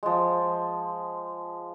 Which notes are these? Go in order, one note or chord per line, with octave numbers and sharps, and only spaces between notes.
F3 G#3